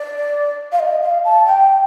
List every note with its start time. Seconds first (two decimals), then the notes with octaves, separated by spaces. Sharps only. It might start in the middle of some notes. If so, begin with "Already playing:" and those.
Already playing: D5
0.72 F5
0.80 D#5
1.02 F5
1.25 A5
1.46 G5